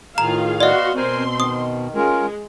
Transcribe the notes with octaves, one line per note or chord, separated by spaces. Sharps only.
A2 D#3 F4 G#4 F5 A#5
B3 F#4 D5 D#5 F5 C6
B2 C4 A#4 C5 G#5 C6
D#3 D#6
G#3 C#4 F4 A#4